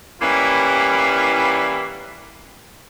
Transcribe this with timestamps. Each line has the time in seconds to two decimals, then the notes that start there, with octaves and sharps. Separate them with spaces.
0.22 E3 G3 A#3 B3 C#4 E4